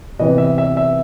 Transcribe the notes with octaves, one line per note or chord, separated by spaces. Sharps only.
C3 E3 B3 D#5
E5
E5
E5